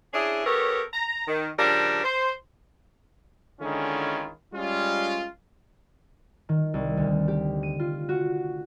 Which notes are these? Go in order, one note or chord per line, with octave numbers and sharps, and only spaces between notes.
C#4 D4 E4 G#4
B3 G4 A4 A#4 C#5
A#5
D#3
C#3 F3 G3 D4 G4 A#4
C5
D3 D#3 G#3 C#4 E4 F4
G3 G#3 C#4 F4
D#3
C2
D2
G4
D#7
F4
F#4